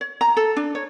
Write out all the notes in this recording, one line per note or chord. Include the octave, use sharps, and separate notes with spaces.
C#5
A#5
A4
D4
C#5